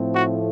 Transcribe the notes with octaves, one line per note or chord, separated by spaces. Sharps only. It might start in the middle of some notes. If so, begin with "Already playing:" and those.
Already playing: A2 F3 A3 C4
F#4